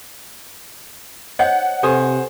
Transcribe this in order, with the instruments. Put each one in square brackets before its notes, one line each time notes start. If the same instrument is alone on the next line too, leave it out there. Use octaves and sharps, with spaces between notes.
[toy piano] C5 C#5 D#5 [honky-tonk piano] F#5
[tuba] C3 [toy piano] G4 A4 B4 [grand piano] C5 G#5